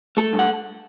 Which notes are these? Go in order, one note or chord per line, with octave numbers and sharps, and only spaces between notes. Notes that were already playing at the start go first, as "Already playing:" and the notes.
A3 A4
G2
F#5